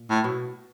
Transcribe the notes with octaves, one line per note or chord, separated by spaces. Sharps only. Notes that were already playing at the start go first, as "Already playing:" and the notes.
Already playing: A#2
A2
B2